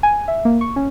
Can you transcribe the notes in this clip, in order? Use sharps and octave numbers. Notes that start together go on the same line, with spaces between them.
G#5
E5
A#3
C#6
C#4